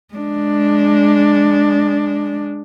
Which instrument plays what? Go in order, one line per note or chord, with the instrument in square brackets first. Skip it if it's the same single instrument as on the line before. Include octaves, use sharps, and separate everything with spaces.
[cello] G#3 D4